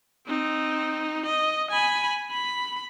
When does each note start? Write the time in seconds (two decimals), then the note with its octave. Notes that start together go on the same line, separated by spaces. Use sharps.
0.27 C4 D#4
1.26 D#5
1.71 G#5 B5
2.31 B5